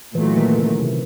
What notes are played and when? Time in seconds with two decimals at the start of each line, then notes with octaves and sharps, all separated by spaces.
0.15 A#2 E3 F#3 A3
0.37 D#3
0.58 C#3
0.79 C3